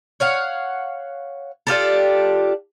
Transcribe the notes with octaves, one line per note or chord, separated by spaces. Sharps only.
C#5 F5 F#5
D4 F4 G4 A4